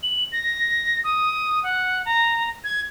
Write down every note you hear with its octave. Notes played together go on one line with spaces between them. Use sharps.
F#7
A#6
D#6
F#5
A#5
G#6